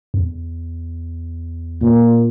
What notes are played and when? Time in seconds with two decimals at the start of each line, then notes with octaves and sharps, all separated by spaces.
0.14 E2
1.82 A#2